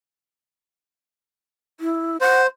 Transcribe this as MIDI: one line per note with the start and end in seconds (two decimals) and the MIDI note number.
1.80 2.17 64
2.21 2.47 72
2.21 2.42 78